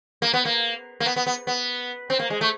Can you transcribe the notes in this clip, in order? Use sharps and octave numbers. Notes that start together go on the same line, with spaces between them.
A#3
B3
A#3
A#3
B3
B3
B3
B3
C4
A#3
G#3
A3